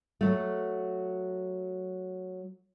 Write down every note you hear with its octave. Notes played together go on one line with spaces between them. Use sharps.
F#3 A3